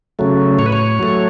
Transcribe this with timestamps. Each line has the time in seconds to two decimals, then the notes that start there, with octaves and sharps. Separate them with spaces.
0.19 C#3 F#3 A3
0.59 A2 C#5
0.66 B4
0.72 C#5
0.99 F#3 A3